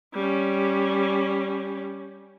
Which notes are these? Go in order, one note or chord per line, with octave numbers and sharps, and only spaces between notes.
G3 C#4